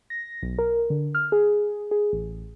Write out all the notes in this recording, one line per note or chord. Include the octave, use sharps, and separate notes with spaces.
A#6
B1
A#4
D3
F6
G#4
G#4
A1